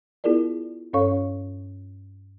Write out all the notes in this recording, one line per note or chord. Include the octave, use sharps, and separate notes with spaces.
B3 E4 F4 G#4 A#4 D5
G2 C#4 A4 C#5 F5 C#6